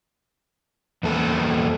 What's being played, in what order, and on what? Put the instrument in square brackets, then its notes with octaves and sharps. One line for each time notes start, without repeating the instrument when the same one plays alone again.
[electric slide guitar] E2 A#3 A4